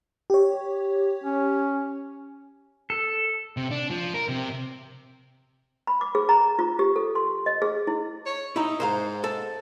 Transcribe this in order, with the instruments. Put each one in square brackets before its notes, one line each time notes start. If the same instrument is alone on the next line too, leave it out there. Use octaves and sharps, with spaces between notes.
[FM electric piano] G4 C#5
[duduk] C#4
[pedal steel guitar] A4
[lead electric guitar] C3
D4
F3
A#4
C3
[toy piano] B5
D6
G#4
A#5
F4
G4
A4
C6
D#5
G#4
E4
[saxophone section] C#5
[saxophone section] D#4 [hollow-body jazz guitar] E4 A#5
[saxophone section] G#2 [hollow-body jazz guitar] C5 F5 A#5
[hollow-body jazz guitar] A4